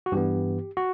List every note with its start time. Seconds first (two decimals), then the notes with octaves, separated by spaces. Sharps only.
0.06 F#4
0.12 G2 E3 B3 G4
0.77 F#4